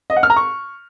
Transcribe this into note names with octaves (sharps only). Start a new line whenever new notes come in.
D#5
F#5
F6
A#5
C#6